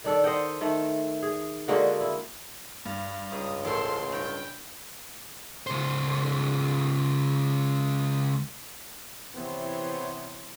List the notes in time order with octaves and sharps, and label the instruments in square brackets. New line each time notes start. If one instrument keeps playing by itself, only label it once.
[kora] D#3 D4 A4
C5 D#5 F#5 G5
D#3 A3
G#4
D3 G#3 A#3 F#4
E4
[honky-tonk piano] G2
[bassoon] C#2 [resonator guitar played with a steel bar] G#2 [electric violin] D#6
[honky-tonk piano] A1 A#4 C5 [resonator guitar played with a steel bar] E2 A4 [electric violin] C6
[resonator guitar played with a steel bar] G2 [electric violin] G5
[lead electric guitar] C#2 C5
[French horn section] C3 [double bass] E3 [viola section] B3 C5 C#5 [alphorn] C4